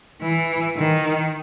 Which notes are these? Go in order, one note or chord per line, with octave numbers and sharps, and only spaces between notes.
E3
D#3